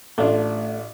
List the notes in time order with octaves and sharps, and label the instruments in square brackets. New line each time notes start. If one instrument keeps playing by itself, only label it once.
[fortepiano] A1 D4 F4 [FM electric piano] A3